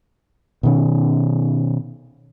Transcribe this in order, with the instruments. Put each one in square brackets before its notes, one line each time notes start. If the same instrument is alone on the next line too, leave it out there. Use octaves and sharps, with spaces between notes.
[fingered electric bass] B2 D#3 C#4